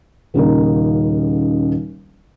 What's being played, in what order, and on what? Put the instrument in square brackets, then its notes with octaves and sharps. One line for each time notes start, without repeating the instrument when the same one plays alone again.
[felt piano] D#1 C#3 A#3 D#4